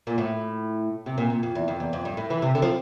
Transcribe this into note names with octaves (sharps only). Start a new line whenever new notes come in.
A#2
A2
C3
A#2
A#2
F2
E2
F2
E2
F2
G2
A2
E3
C3
D3
F3